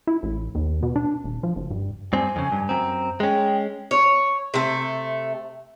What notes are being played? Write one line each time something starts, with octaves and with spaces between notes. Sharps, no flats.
E4
A1
D#2
B2
D4
D#1
F3
F#1
G2
G2 C4 G#5
F2 C#3
G2
F#2 C4 A#5
G#3 C#4 G5
C#5
C3 A3